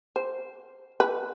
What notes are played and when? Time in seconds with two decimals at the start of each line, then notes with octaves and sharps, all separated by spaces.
0.16 C5
1.00 B4